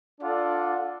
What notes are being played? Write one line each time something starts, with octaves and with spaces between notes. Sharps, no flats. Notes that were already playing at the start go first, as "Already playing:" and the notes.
D4 F4 A4 D5 F#5